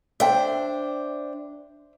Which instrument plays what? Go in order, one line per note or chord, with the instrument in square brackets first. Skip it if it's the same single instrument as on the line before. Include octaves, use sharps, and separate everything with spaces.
[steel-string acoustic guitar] D4 C5 [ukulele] E5 G5